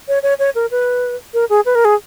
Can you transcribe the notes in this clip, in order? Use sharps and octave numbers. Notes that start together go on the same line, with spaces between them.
C#5
C#5
C#5
A#4
B4
A#4
G#4
B4
A#4
G#4